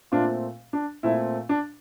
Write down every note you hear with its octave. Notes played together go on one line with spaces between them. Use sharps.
A#2 A3 C4 D4 F4
D4
A#2 A3 C4 E4
D4